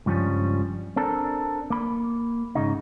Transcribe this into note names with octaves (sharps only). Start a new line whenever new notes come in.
C#2 G2 F3 G3 C#4
C4 D4 A4 A#4
A#3 B5
G#2 C#3 D#4